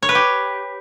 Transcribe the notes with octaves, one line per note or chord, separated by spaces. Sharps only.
C#5
B4
G4